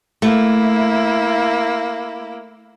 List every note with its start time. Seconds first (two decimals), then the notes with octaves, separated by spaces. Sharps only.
0.22 A3 A#3 E4